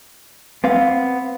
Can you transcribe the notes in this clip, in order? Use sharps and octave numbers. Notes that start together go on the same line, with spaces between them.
B3 C4 F5